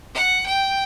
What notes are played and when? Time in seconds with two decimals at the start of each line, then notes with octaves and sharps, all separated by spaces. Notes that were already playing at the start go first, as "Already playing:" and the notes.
0.15 F#5
0.47 G5